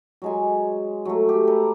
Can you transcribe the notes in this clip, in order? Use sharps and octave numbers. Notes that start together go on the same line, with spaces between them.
F#3 G#3 G#5
F#3 A3
G4
A4 B4 A#5